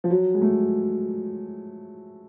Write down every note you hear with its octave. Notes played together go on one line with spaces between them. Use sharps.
F3
F#3
G#3
A3